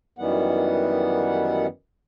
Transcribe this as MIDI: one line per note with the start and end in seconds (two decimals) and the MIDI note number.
0.19 1.67 42
0.19 1.67 51
0.19 1.67 52
0.19 1.67 55
0.19 1.67 59
0.19 1.67 78